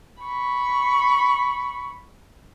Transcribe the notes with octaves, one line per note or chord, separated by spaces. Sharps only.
B5 C#6